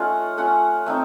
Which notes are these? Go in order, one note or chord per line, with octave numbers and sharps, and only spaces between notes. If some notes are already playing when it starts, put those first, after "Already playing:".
Already playing: A3 C#4 D#4 F4 F#5
A3 C#4 F4 F#5
A3 C4 D#4